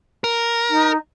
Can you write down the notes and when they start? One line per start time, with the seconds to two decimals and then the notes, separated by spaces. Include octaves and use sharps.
0.24 A#4
0.70 D#4